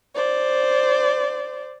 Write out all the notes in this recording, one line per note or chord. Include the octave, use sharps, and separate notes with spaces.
C5 D5